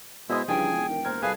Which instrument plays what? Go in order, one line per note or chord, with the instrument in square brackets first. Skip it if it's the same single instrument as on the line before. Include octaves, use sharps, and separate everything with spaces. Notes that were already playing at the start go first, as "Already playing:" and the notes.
[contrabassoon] B2 [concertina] G#3 E4 E5 [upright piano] C5 D#5 D#6
[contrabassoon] G2 [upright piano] C#3 E3 F3 [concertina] G#4 G#5 [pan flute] G5
[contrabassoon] E1
[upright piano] D#3
[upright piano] D#2 C5 G#6 [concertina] A#4
[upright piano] C2 A4 G#6 [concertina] G#4 B4 G#5 [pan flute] F5